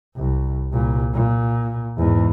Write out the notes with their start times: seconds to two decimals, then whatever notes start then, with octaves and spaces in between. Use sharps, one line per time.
0.16 C2
0.72 C2 A#2
1.14 A#2
1.98 E2 G#2